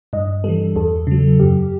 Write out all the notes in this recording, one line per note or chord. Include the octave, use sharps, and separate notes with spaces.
G2 D#5
E3 G3 A4
E2 A4
C#3 F#3
F#2 G4